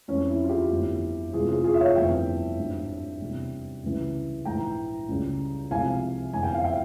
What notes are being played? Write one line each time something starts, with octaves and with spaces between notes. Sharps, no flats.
F2 E3 G#3 C#4
E4
F4
E4 G4
G1 F2 E3
E2 C3 E3 G#3 F4 G#4
F4 G#4
F4 G#4
E5
C#5 F5
G1 F2 E3 G3 E5 G5
G#1 G2 G3
E2 C3 G3
C#2 C#3 E3 G3
A#1 G#2 E3 G#3 G5 A#5
C#2 C#3 G3
C2 C3 F3 G#3 F5 G#5
G1 F2 E3 G#3 G#5
G5
F5
E5 G5